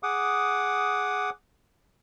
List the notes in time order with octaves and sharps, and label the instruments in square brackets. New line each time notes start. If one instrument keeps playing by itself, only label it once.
[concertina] G#4 F#5 D6 D#6